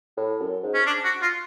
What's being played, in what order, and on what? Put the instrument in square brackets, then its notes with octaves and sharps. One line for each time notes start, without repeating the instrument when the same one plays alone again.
[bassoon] A2
F#2
G#2
[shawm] C#4
D4
F#4
F4